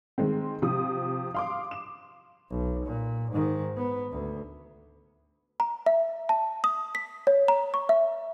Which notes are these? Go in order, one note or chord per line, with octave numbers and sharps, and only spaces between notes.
D#3 G#3 C4
C3 F3 D#6
F5 C6 D6
E7
B1
A#2
G#2 D#3
B3
D2
A#5
E5
A5
D#6
B6
C#5
A#5
C#6
E5